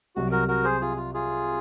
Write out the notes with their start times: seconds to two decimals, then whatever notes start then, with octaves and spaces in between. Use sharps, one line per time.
0.16 C2 C3 F#3 F#4
0.32 F#4 A#4
0.48 F#4 A#4
0.64 G#4 C5
0.81 F4 G#4
0.97 F4
1.14 F4 G#4